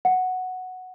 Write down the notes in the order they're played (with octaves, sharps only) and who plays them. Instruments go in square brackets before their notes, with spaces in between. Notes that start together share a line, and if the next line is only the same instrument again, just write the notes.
[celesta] F#5